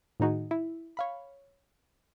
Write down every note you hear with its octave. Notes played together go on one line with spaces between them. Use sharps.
A2 D#3 D#4 F#4 G#4
E4
C#5 F5 B5